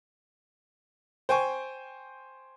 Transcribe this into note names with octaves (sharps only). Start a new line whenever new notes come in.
C5 G5 G#5 C#6